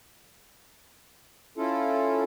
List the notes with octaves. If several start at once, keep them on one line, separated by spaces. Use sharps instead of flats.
C#4 E4 F4 A4